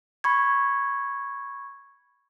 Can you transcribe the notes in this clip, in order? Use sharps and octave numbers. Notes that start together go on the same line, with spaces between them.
B5 C#6 G#6